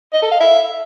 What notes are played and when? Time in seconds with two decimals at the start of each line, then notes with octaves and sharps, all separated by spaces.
0.13 D#5
0.22 A4
0.31 F5
0.40 E5